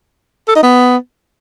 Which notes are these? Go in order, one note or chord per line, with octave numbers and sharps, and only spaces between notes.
A4
D#4
B3